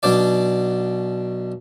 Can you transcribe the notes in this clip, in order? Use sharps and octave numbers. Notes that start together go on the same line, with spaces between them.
B1 B2 D4 D5